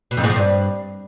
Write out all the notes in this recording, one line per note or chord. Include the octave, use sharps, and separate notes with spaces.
B2
F2
G#2
F3
G2